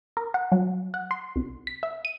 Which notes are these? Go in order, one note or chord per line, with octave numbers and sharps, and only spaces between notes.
A#4
F#5
F#3
F#5
C6
C2
B6
E5
D#7